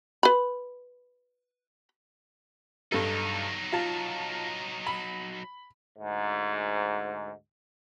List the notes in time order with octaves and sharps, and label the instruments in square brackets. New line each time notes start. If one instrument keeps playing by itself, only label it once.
[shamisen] B4 B5
[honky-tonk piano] G2 A4 [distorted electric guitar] F#3 D#4
[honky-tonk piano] F4 A5
B5
[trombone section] D2 G#2